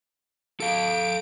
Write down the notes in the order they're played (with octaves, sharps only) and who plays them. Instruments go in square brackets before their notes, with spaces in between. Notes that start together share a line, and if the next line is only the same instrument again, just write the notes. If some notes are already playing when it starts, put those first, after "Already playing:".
[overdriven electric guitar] A4 F5 [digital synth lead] D7